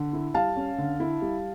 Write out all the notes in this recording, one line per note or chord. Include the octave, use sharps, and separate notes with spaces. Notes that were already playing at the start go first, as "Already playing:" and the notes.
Already playing: D3
E4
G3 F5 A5
C#4
D3
E4
G3